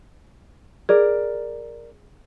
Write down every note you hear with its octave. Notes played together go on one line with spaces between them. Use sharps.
G#4 A#4 D5